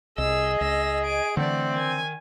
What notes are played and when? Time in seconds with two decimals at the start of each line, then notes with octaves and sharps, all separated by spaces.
0.18 C2 G#4 D#5 E6
0.61 C#2 E6 A#6
1.05 G#5 D7
1.37 D3 E3 A3 C4 D5 F#5
1.75 D#3 G#5